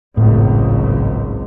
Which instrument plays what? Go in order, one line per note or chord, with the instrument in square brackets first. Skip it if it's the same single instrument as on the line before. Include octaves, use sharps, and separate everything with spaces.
[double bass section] G#1 C#2 F#2 [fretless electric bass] A2